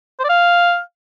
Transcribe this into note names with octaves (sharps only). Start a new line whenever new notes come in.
C5
D5
F5